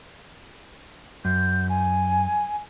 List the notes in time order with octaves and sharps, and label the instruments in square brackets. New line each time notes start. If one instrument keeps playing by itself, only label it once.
[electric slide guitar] F#2 [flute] G6
[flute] G#5